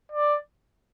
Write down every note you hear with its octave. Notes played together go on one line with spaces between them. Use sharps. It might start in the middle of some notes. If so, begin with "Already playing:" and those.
D5